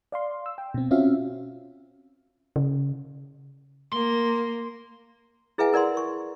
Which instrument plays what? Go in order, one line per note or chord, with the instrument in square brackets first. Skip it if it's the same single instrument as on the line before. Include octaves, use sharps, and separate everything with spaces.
[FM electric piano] D5 F5 C6
E6
G5
B2 C4
C4 C#4 F4 F#4 E5 F5
[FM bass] C#3
[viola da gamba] A#3 [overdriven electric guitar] C6
[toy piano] E4 G#4 B4 E5 F#5 G#5
E4 A#4 D5 F#5 C6
C#6